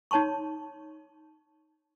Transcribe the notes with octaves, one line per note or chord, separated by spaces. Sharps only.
D#4 C#5 A5 C6 C#6